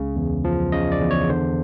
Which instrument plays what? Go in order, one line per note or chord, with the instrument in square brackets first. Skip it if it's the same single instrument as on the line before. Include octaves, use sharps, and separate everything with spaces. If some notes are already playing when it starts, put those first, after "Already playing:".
Already playing: [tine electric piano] C#2 C#3
E2
F3
C#3 D#5
D5
E2
C#5
D3 C5